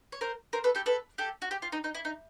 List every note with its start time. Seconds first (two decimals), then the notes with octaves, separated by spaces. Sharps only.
0.12 C#5
0.21 A#4 C5
0.53 A#4 C5
0.64 A4 B4
0.75 G4 A4
0.86 A4 B4
1.18 G4 A4
1.42 F#4
1.51 G4
1.62 F4
1.72 D#4
1.84 D#4
1.95 E4
2.05 D#4